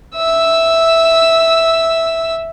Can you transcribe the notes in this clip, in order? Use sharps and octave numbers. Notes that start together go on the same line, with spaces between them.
E5 E6